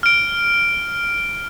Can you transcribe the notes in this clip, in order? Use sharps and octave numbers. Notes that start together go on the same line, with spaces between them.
F6 D7